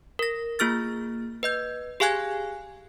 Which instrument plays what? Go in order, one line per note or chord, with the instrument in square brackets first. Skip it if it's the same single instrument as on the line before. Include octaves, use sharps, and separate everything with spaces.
[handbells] A#4 A#6
A#3 F4 G#4 F6 A6
B4 D#5 G6
G4 G#4 F5 G#5 F#6 G#6